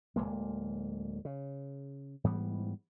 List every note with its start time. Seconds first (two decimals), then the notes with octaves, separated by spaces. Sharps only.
0.16 D1 G1 G#3 A#3
1.25 C#3
2.24 G#2 E3 G3 B3